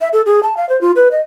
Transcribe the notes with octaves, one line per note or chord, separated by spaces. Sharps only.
E5
A4
G#4
A5
F5
C5
F4
B4
D#5